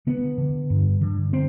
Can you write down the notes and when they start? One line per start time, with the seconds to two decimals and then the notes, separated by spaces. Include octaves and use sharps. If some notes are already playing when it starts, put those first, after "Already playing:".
0.07 D3 B3
0.38 D3
0.70 G2
1.01 D3
1.33 C4